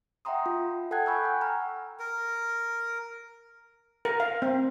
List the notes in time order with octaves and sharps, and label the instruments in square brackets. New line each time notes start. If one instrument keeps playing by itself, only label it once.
[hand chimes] E5 F#5 G5 A#5 C6 D#6
F4
A4 F#5 G5 A5 F#6 G#6
G#5 B5 C#6 E6 G6
F#5 G5
A#5 F6
[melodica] A#4
[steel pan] A#4
F5
C4